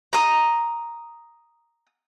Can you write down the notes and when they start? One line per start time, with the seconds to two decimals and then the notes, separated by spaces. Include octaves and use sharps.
0.13 A#5 D#6